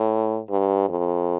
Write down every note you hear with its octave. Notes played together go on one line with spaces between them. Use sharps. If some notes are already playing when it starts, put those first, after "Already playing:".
Already playing: A2
G2
F2